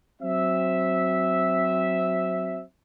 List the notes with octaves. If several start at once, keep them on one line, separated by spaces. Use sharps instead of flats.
F#3 C4 E5